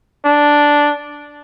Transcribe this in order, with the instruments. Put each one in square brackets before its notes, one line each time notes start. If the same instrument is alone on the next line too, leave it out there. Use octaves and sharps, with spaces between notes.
[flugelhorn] D4